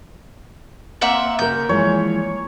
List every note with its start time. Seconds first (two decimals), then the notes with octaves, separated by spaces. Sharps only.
1.01 A#3 C4 E5 F#5
1.39 C#3 A#4 G6
1.69 E3 F3 G#3 C#5